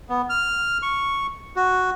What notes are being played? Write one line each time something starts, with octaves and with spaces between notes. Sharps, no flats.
B3
F6
C#6
F#4